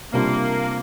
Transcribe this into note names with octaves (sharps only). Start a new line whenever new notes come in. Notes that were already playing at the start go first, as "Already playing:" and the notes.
C3 G3 A#3 D4 F4